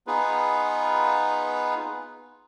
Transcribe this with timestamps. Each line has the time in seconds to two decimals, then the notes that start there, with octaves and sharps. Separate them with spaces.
0.07 B3 D#4 F4 G#4 B4